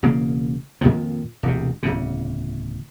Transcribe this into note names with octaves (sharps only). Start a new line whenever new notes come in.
E1 C#3 A#3
F2 A#2 D#3 F3
E1 D2 C3
D1 E2 C#3